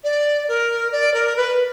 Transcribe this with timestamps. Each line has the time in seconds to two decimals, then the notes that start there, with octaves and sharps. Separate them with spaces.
0.04 D5
0.48 A#4
0.92 D5
1.14 A#4
1.37 B4